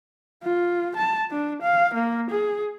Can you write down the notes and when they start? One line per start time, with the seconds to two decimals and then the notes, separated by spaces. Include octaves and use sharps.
0.43 F4
0.96 A5
1.31 D4
1.62 F5
1.94 A#3
2.30 G#4